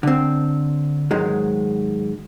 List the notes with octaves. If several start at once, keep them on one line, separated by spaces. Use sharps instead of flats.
D3 C4
G#2 D#3 F#3 G#3